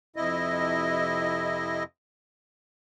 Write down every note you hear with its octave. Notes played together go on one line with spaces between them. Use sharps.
F2 C3 E4 D#5